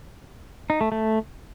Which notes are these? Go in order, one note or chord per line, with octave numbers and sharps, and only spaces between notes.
D#4
A3
A3